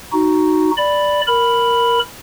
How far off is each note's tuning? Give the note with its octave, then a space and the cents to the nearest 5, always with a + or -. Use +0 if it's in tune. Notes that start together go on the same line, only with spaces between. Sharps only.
D#4 +0 F#4 +0
D5 +0 B5 +0
A#4 +0 B5 +0